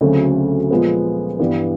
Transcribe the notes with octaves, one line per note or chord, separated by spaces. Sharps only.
D2 C#3 F#3 A3 C4
A#2 F3 G#3 B3
G2 E3 G3 B3